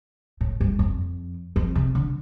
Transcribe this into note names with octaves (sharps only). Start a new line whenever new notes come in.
A2
G2
F2
F2
C3
D3